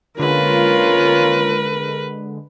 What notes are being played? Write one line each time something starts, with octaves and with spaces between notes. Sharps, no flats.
D3 G#3 A#3 C#4 F4 A#4 B4